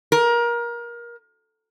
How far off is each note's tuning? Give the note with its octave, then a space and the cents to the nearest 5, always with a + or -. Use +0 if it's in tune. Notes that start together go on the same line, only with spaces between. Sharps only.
A#4 +25